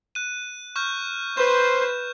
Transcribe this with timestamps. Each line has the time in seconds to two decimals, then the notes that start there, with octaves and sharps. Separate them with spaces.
0.15 F#6 D#7
0.76 C#6 F6 G6
1.37 B4 C5 G6 E7